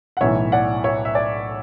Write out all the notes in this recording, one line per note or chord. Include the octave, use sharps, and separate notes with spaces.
F#5
B1 A2 E3 C#5 E5
D5 F#5
C#5 E5
E5
D5